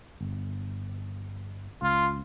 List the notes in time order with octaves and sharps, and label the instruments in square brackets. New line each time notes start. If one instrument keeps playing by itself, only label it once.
[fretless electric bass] G1
[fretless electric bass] C#2 [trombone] F4